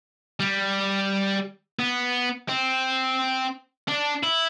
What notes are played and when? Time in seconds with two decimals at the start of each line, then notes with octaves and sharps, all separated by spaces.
0.40 G3
1.79 B3
2.49 C4
3.88 D4
4.23 E4